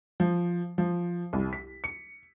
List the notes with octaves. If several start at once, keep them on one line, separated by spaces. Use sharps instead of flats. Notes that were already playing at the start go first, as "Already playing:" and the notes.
F3
F3
C2
B6
C#7